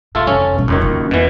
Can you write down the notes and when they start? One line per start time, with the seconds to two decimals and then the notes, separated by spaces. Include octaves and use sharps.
0.15 B2 A3 F4 A4
0.27 F1 C#4 A4
0.54 G#2 B2
0.68 E1 C#2 F#2 D#3 C#4
0.81 A#3
1.11 E2 B2 E3